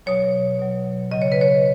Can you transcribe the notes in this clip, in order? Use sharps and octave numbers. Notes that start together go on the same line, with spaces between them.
B2 F#3 C#5
B2 F#3
C#3 F#3 D#5
C#5
B4
C#5